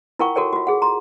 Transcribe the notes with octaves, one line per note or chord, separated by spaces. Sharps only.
E4 F4 A#4 F#5 G5 C#6
F#4 A4 A#4 C#5 G5
F4 F#4
G#4 F#5
A#5 C6